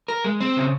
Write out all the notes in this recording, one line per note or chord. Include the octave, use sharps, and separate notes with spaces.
A#4
G#3
C4
C#3